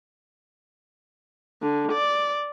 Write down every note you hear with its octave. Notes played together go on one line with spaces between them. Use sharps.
D3
D5